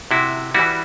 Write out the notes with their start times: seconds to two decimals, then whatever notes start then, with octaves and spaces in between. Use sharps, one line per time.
0.11 C3 E4 F#4
0.54 E3 G3 E4 F#4